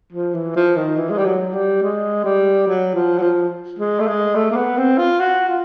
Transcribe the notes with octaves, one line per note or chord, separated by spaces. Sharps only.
F3
E3
F3
D#3
E3
G#3
G3
F#3
G3
G#3
G3
F#3
F3
F#3
F3
G#3
A3
G#3
A3
A#3
B3
C4
F4
F#4
F4